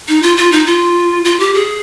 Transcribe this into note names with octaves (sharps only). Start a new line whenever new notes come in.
D#4
F4
F4
D#4
F4
F4
G4
G#4